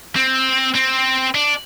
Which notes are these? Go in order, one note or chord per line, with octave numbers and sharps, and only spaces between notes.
C4
C4
D4